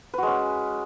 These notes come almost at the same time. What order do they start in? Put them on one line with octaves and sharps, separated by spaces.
B4 F#4 G#3 C#4